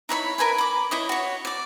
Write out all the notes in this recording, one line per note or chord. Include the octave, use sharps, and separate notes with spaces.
D#4 E4 C#5 B5
A#4 B4 G#5 B5
B5 D6
E4 C#5 D#5
F#4 C#5
D5 D6